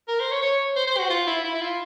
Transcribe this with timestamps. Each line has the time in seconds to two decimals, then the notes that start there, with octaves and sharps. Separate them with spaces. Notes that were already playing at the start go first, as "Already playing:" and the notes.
0.08 A#4
0.20 C5
0.31 C#5
0.42 C#5
0.76 C5
0.87 C5
0.98 F#4
1.10 F4
1.27 E4
1.44 E4
1.55 E4
1.61 F4